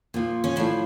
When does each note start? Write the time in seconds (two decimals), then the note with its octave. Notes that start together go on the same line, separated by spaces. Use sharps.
0.14 A#2 F3
0.44 C#4
0.56 A2 D4
0.60 F3